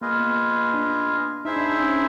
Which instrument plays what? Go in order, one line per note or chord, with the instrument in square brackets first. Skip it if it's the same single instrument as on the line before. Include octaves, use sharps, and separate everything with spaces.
[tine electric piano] A#3 [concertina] F4 G#4 B4 D#5
[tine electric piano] B3
D4
[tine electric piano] D#4 [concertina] E4 G#4 C5 E5
[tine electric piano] D4
D4
C#4